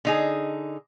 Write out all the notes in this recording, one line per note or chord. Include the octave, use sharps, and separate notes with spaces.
D3 D#4 G#4